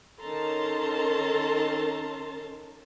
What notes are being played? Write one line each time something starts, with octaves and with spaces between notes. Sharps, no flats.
D#3 C#4 A4 A5 A#5 C6